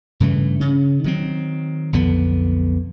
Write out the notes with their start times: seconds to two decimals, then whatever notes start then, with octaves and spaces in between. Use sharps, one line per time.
0.20 G2 C#3 E3 A3
0.60 C#3 C#4
1.04 D#3 F#3 C4
1.93 B1 F2 D3 B3